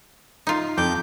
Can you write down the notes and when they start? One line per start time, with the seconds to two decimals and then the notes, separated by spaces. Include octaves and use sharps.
0.47 D#4 F4
0.78 F2 D6 G6